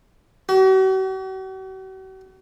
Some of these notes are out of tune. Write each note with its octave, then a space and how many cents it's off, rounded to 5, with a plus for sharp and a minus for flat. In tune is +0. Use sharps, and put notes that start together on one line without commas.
F#4 +45